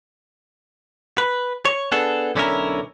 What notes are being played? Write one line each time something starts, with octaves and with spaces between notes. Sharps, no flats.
B4
C#5
B3 D4 G#4 A4
B1 D3 C#4 D4 E4 A#4